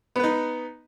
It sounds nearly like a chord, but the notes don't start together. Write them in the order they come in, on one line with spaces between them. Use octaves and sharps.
B3 B4 D#4